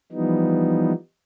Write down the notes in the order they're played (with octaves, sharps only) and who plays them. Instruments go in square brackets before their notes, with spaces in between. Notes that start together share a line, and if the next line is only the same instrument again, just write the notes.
[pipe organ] E3 F3 G3 B3 D#4